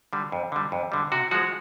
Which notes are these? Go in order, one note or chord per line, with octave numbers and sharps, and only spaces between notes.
D3 G3
F2
D3 G3
F2
D3 G3
C3 F#4
F3 G#3 F#4